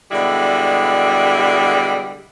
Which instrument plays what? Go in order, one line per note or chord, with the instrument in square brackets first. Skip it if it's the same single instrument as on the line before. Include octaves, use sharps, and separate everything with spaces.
[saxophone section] B2 D3 G3 G#3 E4